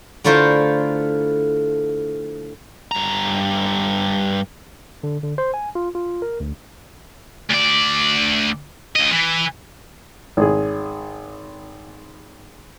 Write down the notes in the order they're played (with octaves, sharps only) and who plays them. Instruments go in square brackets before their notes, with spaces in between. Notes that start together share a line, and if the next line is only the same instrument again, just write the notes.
[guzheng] D3 A3 E4 F4 A#4 C5
[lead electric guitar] G2 A#5
[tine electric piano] D3
D3
C5
G#5
F4
F4
A#4
D2
[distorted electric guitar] D2 D5
C#2 D#5
E3
[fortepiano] G#1 G#4